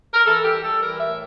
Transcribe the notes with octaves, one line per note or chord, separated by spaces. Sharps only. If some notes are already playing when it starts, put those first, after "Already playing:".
A#4
E3 A4
G4
G3
A4
E3 A#4
E5
A2